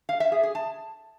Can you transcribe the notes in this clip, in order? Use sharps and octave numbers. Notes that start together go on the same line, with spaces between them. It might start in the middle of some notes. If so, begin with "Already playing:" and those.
F5
E5
G#4
G#4
A5